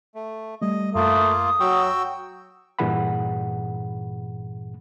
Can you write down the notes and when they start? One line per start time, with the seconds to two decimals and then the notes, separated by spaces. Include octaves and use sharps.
0.15 A3
0.61 G3 A3 D#5
0.95 F#2 A3 A#3 F4 D#6
1.60 F#3 F#4 G5 C#6 E6
2.79 G2 A#2 E3 G#4 F#5 B5